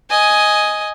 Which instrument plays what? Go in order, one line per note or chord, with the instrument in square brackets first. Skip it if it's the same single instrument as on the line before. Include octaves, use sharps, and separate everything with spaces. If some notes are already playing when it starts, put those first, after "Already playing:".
[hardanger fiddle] D#5 G#5